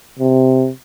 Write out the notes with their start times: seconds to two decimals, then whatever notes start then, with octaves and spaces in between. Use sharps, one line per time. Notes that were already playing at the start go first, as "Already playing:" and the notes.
0.19 C3